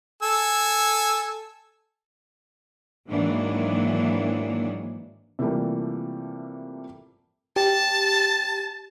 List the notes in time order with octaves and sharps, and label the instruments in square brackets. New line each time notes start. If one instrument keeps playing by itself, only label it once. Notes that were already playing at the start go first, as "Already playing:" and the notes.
[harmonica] A4 G#5 E6
[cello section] G#2 D#3 E3 F#3 A#3 D4
[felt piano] C3 E3 F3 G3 A3 A#3
[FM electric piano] G4 [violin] A5